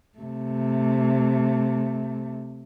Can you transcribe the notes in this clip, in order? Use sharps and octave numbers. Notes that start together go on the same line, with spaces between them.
C3 A3